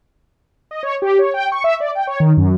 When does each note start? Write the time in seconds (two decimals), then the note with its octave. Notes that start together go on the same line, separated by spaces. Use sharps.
0.71 D#5
0.83 C#5
1.02 G4
1.19 C#5
1.34 G5
1.52 C#6
1.64 E5
1.80 D5
1.95 G5
2.07 C#5
2.20 D#3
2.37 F#2